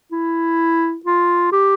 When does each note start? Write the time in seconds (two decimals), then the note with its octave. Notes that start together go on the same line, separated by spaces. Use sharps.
0.12 E4
1.05 F4
1.52 G4